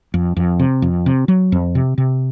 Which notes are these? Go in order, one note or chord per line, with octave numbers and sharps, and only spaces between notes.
F2
F2
C3
F2
C3
F#3
F2
C3
C3